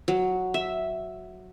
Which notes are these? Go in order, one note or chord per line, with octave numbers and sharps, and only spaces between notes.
F#3
E5